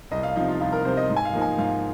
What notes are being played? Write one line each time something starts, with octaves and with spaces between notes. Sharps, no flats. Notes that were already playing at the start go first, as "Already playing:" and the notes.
C2 D#5
F5
C3 F3 D#4
F4
C2 F4
A#4
C3 F3 C5
D#5
G#2
G#5
F5
F3 A#3 D#4
G#5
G#2 F5